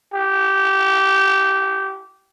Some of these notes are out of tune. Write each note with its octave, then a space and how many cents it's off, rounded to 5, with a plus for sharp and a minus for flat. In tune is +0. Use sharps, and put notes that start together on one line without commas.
G4 -15